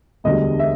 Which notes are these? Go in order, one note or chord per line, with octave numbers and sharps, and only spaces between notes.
E1 D2 D3 G3 D#5
E5